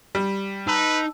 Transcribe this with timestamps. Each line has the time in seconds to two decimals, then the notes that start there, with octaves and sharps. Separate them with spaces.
0.15 G3
0.67 D#4 B4 A5 E6